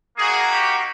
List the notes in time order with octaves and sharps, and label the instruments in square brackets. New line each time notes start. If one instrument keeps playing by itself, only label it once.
[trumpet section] A#3 D#4 F#4 G#4
G4